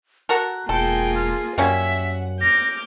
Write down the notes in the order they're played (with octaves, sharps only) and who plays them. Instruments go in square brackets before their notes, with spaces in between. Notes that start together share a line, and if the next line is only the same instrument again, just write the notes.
[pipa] F#4 A4 A#4 [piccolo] F#6
[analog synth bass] E1 [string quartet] A#3 F4 G#4 [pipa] A4 [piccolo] G5
[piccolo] F6
[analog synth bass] F#2 [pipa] G3 A#3 C#4 [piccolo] E5 [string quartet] F#5
[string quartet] D6 F6 G6 [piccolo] A#6